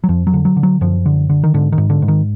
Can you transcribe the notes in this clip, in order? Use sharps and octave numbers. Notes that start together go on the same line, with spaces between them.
F#3
F2 F3
F#3
D3
F#3
D3
F#3
F#2 F3
D3
D3
D#3
G#2 D3
D#3
G#2
D3
G#2
D#3